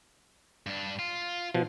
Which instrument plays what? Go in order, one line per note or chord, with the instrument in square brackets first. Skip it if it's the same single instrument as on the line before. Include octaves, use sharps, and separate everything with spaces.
[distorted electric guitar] G2 D4
F4
[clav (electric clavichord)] B2 F3